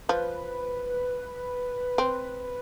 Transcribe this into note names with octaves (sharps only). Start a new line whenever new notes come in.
F3 B4
C4